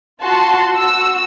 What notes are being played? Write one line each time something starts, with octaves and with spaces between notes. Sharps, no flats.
F4 F#4 A5 C6
F#4 E6